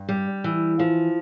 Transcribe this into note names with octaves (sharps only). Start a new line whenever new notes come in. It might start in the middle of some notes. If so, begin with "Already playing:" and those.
Already playing: G2
G3
E3
F3